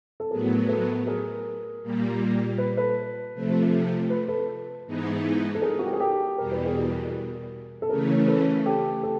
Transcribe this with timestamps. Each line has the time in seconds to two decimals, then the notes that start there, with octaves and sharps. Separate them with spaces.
0.20 A4
0.31 A2 F#3 B3 G#4 A#4
0.69 A4 B4
1.07 G#4 A#4
1.83 A#2 G3 A#3
2.58 B4
2.77 A4 B4
3.34 C3 F3 A3
4.10 B4
4.28 A4 B4
4.86 G#2 E3 G#3 B3 D#4
5.55 A4
5.62 G#4 A#4
5.79 F#4
5.86 G4
5.93 G#4
6.00 G4 A4
6.38 E2 B2 G3 A#4
6.52 B4
6.65 G#4 A#4
7.82 A4
7.89 C#3 E3 A3 C#4 G#4 A#4
8.27 A4 B4
8.66 G4 A4
9.03 G4 A4